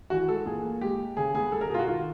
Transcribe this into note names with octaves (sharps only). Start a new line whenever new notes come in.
E3 F#4
G#3 A4
A#2 G#4
A#3
G#3 G4
G#3
C#3 G#4
B3 G#4
G3 A4
A#4
B2 F4 G#4
F#4
D#3 F4